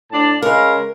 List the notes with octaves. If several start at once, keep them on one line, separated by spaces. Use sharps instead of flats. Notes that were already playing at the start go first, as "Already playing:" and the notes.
A2 D4 A5
C#3 G#3 A#4 F5